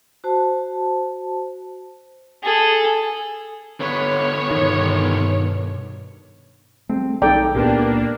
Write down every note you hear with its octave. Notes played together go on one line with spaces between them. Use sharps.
F#4 C5 A5
G#4 A4
D3 B3 C#5
G2 B2 D#3
G3 A3 C4
B1 D#3 A4 D5 G5 A#5
C#2 A#2 A#3 B3 D4 G4